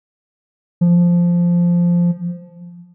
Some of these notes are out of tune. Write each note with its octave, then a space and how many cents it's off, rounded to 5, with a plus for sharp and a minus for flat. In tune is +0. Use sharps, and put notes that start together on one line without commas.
F3 -5